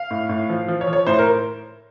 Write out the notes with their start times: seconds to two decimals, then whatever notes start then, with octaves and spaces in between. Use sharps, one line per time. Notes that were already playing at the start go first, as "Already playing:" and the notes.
Already playing: F5
0.11 A2
0.29 A2
0.49 F3
0.68 F3
0.81 C#5
0.88 F3
0.93 C#5
1.07 A2 C5
1.19 A#4